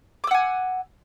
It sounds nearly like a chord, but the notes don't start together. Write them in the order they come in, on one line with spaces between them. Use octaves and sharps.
D6 E6 F#5 G#5